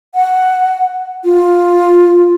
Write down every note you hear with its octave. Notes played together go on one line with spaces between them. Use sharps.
F#5
F4